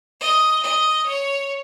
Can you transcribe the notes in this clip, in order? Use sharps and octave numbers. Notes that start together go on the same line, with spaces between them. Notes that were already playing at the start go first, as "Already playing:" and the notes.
D#5
D#5
C#5